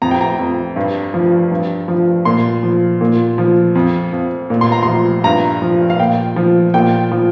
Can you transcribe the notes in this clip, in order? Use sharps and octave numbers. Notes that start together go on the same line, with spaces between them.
F2 A#5
G5
A#5
F2
G2
F3
G2
F3
A#2 C6
F3
A#2
F3
F2
F2
A#2
C6
A#5
F3 C6
G2 A#5
F3
F5
A#2 G5
F3
A#2 G5
F3